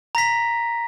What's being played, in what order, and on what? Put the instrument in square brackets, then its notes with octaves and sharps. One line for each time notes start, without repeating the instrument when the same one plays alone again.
[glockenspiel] A#5 A#6 B6